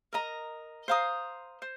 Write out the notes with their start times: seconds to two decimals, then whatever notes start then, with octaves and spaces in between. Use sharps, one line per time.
0.13 A#4 D#5 A#5
0.88 C5 F5 A#5 D#6
1.62 C5